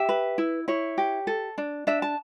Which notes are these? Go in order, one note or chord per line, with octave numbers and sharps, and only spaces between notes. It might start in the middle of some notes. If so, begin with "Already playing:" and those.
Already playing: G4 E5
B4
E4
E4 C#5
G4
A4
D4
D4 E5
A5